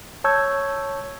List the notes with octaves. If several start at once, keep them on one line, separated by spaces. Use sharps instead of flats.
C#5 A5 C#6 E6 G6 G#6